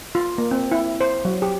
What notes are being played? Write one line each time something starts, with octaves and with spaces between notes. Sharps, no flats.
F4
A#3
C4
E4
C5
F#3
G4